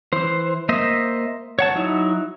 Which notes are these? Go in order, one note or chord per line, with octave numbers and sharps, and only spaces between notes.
E3 C5
A#3 C5 D#5 E5
C#5 F#5 A5
F#3 D#4 E4